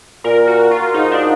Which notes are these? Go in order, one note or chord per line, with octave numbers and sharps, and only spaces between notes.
A#2 A#4
F#4
F4
G#2 D#4
D4